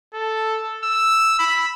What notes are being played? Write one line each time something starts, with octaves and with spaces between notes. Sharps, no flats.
A4
E6
B5